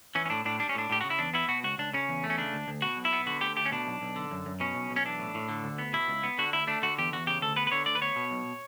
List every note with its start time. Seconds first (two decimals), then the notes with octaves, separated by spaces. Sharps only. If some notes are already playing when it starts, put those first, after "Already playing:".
0.15 E3 C#4
0.26 C#4
0.30 A2 D4
0.45 A2 D4
0.60 G3 D4
0.69 C#4
0.75 A2 D4
0.90 A2 G4
1.01 C#3 F#4
1.10 E4
1.19 E2 D4
1.34 B3 E4
1.48 B2 F#4
1.64 C#2 F#4
1.78 C#2 D4
1.94 C#3 C#4
2.09 E2
2.24 A3
2.30 C#4
2.38 C#3 D4
2.53 D2
2.68 D2
2.82 B2 F#4
2.97 B1
3.05 E4
3.13 B3
3.26 D3 F#4
3.41 D2 G4
3.56 A3 G4
3.66 C#4
3.72 B2 D4
3.87 B1
4.01 B1
4.16 D3
4.31 F#2
4.46 F#2
4.60 B2 C#4
4.75 B1
4.91 B1
4.96 C#4
5.05 E3 D4
5.19 A2
5.35 A2
5.49 D3
5.64 D2
5.78 B3
5.93 B2 E4
6.08 C#2
6.23 B3
6.38 D3 F#4
6.53 D2 E4
6.67 A3 D4
6.82 D3 F#4
6.98 E2 G4
7.12 E2 F#4
7.27 C#3 G4
7.42 D2 A4
7.56 B3 B4
7.67 B4
7.72 D3 C#5
7.86 D2 D5
7.95 B4
8.01 B3 C#5
8.16 B2
8.31 B1